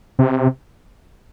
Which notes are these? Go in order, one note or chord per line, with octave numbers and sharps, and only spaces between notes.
C3